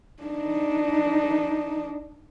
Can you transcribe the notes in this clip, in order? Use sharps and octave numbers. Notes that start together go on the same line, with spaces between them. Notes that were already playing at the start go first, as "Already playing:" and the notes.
D4 D#4